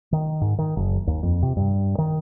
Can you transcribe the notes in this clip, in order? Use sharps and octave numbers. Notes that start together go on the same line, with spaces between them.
D#3
G#2
D#3
F#1
D#2
F2
C3
G2
D#3